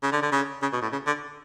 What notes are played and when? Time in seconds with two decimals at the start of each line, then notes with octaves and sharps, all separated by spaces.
0.03 C#3
0.12 D3
0.22 D3
0.32 C#3
0.62 C#3
0.72 B2
0.82 A2
0.92 C#3
1.07 D3